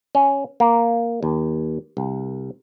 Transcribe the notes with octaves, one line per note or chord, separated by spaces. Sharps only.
C#4
A#3
D#2
C2